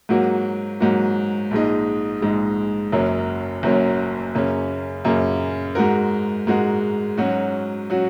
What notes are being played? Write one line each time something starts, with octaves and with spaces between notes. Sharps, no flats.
G#2 F#3 A#3 F#4
G#2 F#3 A#3 F#4
A#1 G#2 G#3 D#4
A#1 G#2 G#3 D#4
F#1 F#2 F#3 C#4 A#4
F#1 F#2 F#3 C#4 A#4
F#2 C#3 A#3 C#4
F#2 C#3 A#3 C#4
G#2 G#3 F#4 A#4
G#2 G#3 F#4 A#4
G#2 F#3 C#4 F#4
F#3 C#4 F#4